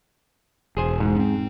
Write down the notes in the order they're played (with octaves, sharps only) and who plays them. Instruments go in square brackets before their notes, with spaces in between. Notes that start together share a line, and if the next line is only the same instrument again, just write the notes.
[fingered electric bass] E1 [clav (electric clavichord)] G#4 C5 G#5
[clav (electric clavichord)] G#2
[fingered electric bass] C4 C#4